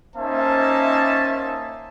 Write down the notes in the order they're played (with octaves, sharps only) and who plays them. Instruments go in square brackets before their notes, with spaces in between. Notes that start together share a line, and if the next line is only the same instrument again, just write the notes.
[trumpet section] A#3 C#4 D#4 C5 E5 A5